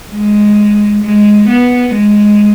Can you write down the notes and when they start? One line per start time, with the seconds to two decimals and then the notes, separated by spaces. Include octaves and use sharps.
0.12 G#3
1.03 G#3
1.49 B3
1.95 G#3